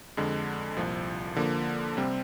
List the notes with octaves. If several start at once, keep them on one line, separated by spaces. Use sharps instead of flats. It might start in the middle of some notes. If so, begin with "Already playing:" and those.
F2 D3 G#3
C2 A#2 F3
D3 F3 A#3
C3 G3 C4